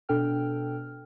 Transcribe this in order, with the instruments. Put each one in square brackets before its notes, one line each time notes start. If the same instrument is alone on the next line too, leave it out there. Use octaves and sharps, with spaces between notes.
[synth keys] B2 D4 A4 G5 F6